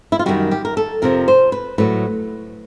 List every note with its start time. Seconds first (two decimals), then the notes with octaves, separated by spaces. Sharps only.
0.12 E4
0.19 F4
0.26 F#2 D#3 G3 F#4
0.51 G4
0.65 A#4
0.77 A4
1.02 F2 C3 F3 A#4
1.28 C5
1.52 B4
1.78 A2 F#3 B4